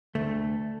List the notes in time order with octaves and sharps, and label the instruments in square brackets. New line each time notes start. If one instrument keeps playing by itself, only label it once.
[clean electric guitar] D2 [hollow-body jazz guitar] A3